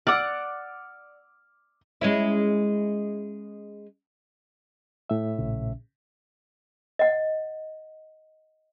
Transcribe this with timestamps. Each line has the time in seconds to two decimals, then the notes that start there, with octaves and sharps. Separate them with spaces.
0.07 D5 F#5 D6 E6 F6
2.01 G#3 C#4 E4
5.10 A2 E5
5.38 A#1 C#3
6.99 D#5 F#5